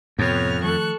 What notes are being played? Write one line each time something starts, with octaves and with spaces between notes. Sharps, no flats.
F2 A2 C3 B3 C#5 F6
D#3 F3 A3 A4 C#6 F#6